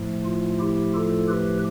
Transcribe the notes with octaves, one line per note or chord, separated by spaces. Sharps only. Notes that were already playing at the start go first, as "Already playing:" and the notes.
Already playing: A2 F3 A3
F4
E4 G4
F4 A4
G4 B4